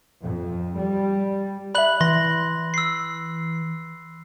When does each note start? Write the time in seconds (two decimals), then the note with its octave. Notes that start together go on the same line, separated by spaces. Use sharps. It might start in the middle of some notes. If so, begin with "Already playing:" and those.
0.23 F2
0.78 G3
1.75 D5 E5 B5 F#6 F#7
2.01 E3 C6 A#6
2.74 E6 C7